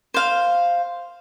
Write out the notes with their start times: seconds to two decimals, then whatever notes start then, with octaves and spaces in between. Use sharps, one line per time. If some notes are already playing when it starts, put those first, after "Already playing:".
0.14 C5 F5